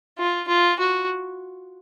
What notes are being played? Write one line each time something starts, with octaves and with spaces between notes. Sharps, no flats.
F4
F4
F#4